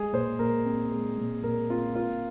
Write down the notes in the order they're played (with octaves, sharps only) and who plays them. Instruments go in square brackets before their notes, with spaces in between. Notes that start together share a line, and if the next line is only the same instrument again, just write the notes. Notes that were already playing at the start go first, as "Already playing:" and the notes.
Already playing: [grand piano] G#3 G#4
A#2 C5
A#2 A#4
C4
G#3
A#2
A#2 A#4
C4 F4
A#3 F4